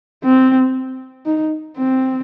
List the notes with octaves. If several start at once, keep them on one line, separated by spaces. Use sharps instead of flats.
C4
D#4
C4